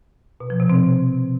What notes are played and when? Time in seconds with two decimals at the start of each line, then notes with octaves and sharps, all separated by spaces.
0.40 B2
0.50 F3
0.60 C3
0.70 C4